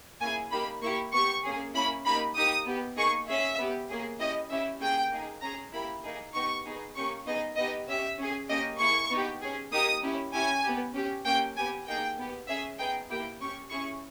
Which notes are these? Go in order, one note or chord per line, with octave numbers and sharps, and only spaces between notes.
A#3 C#4 E4 G#4 G#5
A#3 D#4 G4 B5
A#3 E4 G4 C#6
B3 G4 C#6
A#3 C#4 G#4
A#3 C#4 E4 B5
A#3 D#4 G4 B5
A#3 D#4 G4 D#6
B3 G4
A#3 D#4 G#4 C#6
C#4 G#4 E5
B3 G4
A#3 C#4 G#4
C#4 E4 G4 D#5
C#4 E4 G4 E5
A#3 C#4 G#4 G5
A#3 D#4 G#4
C#4 G#4 A#5
A#3 E4 G4 B5
A#3 D#4 G#4
B3 D#4 G4 C#6
B3 D#4 G#4
A#3 C#4 G4 C#6
B3 D#4 G#4 D#5
B3 D#4 G4 D#5
C#4 G4 E5
C#4 G#4
A#3 C#4 G4 D#5
A#3 E4 G#4 C#6
B3 D#4 G4
C#4 G#4
A#3 D#4 G4 D#6
C#4 E4 G4
C#4 E4 G4 G#5
B3 G4
C#4 G4
A#3 C#4 G4 G5
B3 G4 G#5
A#3 D#4 G#4 G5
B3 G4
C#4 G#4 E5
B3 D#4 G#4 G5
A#3 E4 G4 G5
C#4 G4 C#6
C#4 E4 G#4 C#6